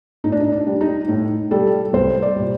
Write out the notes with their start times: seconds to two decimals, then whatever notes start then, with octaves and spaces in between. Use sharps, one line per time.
0.24 A2 D#4
0.32 D4
0.40 D#4
0.52 D4
0.67 G3
0.81 D#4
1.08 A2
1.51 G3 A4
1.93 C2 C5
2.22 D5
2.36 A#2 G3